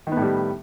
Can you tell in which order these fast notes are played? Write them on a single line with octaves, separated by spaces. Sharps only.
D#3 B3 A2 G3